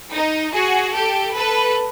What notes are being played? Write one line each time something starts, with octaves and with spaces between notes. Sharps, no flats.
D#4
F#4 G#4
G4 A4
A4 B4